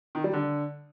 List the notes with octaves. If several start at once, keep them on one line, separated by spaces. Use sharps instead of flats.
D#3
G3
D3